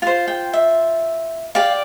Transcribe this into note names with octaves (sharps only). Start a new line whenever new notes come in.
F4 C5 F5
G5
E5
G4 D5 F5